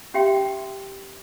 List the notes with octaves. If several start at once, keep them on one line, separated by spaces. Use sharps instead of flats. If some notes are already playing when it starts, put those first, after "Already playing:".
C#4 G4 E5 G5 C6